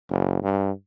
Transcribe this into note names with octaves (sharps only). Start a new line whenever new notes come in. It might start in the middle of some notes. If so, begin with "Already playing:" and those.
F#1
G2